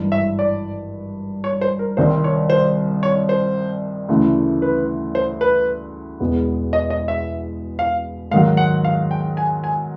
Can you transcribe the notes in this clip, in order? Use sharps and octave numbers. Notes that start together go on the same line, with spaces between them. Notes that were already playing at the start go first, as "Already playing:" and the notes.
Already playing: G#1 G2 E3
E5
D5
C#5
C5
A#4
C2 C3 D#3 G3 C4 C5
C#5
C5
C#5
C5
D2 C#3 E3 A3
B4
C5
B4
E1 E2 B2 G#3 B3
D#5
D#5
E5
F5
G#2 D#3 F#3 F5
F#5
F5
G5
G#5
G#5